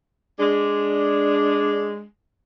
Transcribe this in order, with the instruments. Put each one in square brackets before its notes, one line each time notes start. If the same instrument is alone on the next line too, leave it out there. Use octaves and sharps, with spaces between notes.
[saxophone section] G#3 D4